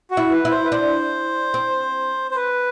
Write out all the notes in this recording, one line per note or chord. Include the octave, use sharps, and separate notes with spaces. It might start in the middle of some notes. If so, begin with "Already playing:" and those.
F#4
E4
B4
E4
C5
B4
D4 C5
C4
C5
B4